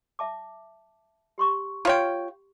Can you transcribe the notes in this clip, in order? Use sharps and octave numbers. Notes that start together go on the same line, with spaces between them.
E5 A5 D6
G4 C6 C#6
F4 C#5 G5